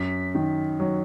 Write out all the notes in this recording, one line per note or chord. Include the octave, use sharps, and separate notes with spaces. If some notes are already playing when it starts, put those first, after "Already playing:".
Already playing: F#2 B6
D#3
F#3